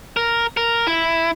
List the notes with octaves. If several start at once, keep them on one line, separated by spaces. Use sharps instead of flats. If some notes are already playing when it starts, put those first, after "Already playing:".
A#4
A#4
E4